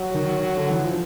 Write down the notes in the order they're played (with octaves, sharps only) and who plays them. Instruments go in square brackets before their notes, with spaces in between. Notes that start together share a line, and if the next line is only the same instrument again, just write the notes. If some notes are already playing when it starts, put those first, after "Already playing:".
Already playing: [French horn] F#3
[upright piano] D#3
D3
E3
F3